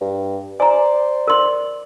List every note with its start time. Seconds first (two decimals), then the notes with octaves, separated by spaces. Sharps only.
0.01 G2
0.60 C5 D5 G#5 A#5
1.27 A#4 C6